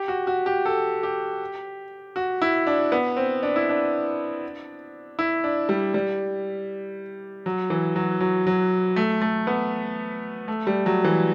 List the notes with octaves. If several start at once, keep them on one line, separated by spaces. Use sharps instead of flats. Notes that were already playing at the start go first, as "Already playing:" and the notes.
Already playing: G4
F#4
F#4
G4
A4
G4
F#4
E4
D4
B3
C4
D4
E4
D4
E4
D4
G3
G3
F#3
E3
F#3
F#3
F#3
A3
A3
B3
A3
G3
F#3
E3